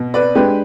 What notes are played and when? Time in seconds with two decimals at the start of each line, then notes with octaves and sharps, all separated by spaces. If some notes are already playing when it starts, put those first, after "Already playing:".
Already playing: B2
0.14 B4 D5
0.35 G#3 D4 G4 B4